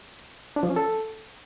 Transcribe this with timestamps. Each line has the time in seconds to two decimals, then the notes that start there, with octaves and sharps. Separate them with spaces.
0.56 D4
0.63 F3
0.70 C#4
0.76 A4